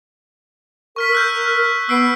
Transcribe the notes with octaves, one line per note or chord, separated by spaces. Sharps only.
A#4 C#6 F6 B6
A#4 E6 F#6 G6
B3 E6 C7 D7